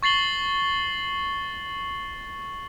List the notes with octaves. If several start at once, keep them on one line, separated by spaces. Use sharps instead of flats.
C#6 A6 C7 F#7 G7